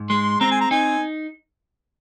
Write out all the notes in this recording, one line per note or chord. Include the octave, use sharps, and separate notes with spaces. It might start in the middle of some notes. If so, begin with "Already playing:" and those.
Already playing: G#2
G#3 C6
C4 A#5
G#5
A#5
D#4 G#5